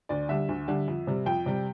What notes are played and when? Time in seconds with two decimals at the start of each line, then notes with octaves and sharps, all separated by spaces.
0.09 D2 D5
0.29 D3 G3 E5
0.49 D2
0.68 D3 G3
0.88 F2
1.07 C3 G3
1.26 F2 G5
1.46 C3 G3